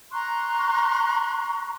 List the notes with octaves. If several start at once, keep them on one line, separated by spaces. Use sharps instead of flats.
A#5 C6 C#6 F#6